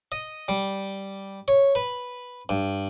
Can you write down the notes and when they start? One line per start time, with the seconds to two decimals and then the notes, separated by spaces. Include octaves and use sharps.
0.12 D#5
0.48 G3
1.48 C#5
1.75 B4
2.49 G2